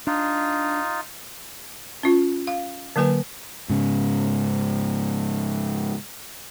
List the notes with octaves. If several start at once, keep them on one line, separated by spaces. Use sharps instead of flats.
D4 D#4 F4
C#4 F4
F5
D3 F#3 A#3 B4 G#5
G#2 C#3